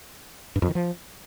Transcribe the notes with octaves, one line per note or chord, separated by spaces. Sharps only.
G2
F2
D#3
F3